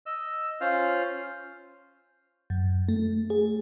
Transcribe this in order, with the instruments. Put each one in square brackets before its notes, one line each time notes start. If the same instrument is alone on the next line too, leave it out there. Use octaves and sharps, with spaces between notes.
[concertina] D#5 E6
C#4 F4 C5 F5 F6
[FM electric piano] F#2
A3
G#4